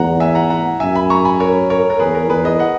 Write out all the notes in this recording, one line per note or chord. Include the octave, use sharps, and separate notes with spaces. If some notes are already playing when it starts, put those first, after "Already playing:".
Already playing: E2 F#5 A#5
E5 G#5
F#5 A#5
F#5 A#5
F#2 E5 G#5
G#5 B5
A#5 C#6
G#5 B5
A#4 C#5
A#4 C#5
A#4
E2 G#4 B4
A#4
E2 G#4 B4
B4 D#5
D#5 F#5